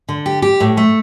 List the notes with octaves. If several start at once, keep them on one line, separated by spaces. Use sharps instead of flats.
D3
G4
G4
A2
A3